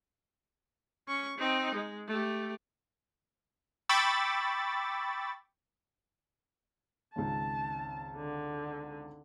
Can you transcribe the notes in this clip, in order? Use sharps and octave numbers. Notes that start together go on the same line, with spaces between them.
C#4 C#6
C4 D#4
G#3
A3 G4
G5 B5 C#6 D6 E6 A6
G#1 C#2 A5
D3